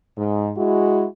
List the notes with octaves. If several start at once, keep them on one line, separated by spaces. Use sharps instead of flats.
G#2
G#3 E4 F#4